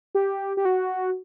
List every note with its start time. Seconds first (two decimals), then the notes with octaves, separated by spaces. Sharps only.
0.15 G4
0.57 G4
0.65 F#4